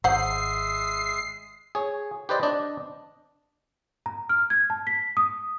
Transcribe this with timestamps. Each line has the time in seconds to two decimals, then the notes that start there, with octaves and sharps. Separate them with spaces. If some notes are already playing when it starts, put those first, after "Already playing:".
0.04 G#1 G#3 C5 E5 F#5 D#6 C7
1.75 G#4 C#5
2.29 G4 B4 C5 D5 D#5
2.43 D4 D5 D#5
4.06 A#5
4.29 F6
4.50 G#6
4.70 A5
4.87 B6
5.17 D#6